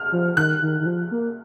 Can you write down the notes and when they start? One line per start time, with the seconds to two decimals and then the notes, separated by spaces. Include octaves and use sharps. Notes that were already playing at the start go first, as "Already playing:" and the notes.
Already playing: F6
0.12 F3
0.37 D#3 F#6
0.62 D#3
0.81 D#3
0.86 F3
1.11 A#3